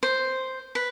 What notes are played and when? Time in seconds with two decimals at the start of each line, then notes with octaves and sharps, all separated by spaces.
0.03 C5
0.75 B4